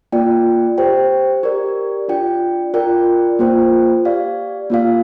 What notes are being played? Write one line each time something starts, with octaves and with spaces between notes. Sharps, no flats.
A#3 F4 D5 G5
G4 C5 G5
G4 A#4 D5
D4 F4 D5 G5
F4 A#4 D5 G5
A#3 F4 C5 G5
G4 D5 F5
A#3 F4 D5 F5